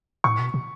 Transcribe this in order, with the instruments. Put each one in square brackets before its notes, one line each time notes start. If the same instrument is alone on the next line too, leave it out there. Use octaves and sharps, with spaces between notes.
[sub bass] A2 [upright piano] C#6
[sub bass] B2
B2